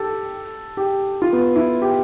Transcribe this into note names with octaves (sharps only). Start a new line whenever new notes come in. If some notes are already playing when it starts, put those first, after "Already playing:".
Already playing: G4 A4
G4
F4
B3
E4
G4